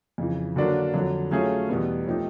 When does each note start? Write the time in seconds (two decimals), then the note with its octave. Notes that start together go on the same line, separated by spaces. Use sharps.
0.18 F2 C#3 E3
0.56 D3 F#3 A#3 D4 F#4
0.94 F2 D3 F#3
1.31 F#3 A3 C#4 F4 G#4
1.69 E2 B2 G3 B3
2.06 F3 A3 C4 D#4 G4